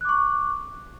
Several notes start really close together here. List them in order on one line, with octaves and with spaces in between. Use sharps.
F#6 D6 C#6